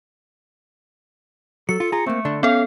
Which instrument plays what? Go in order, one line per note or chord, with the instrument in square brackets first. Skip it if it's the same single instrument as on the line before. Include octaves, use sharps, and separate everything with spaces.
[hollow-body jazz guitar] F#3 [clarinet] A4 [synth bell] C#7
[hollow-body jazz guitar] F4
[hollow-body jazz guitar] F4 G#4 [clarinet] A#5
[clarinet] A3 [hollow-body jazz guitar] A#3 C4
[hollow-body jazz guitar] D3 D4
[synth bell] B3 A4 [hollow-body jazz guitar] C#4 [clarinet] F5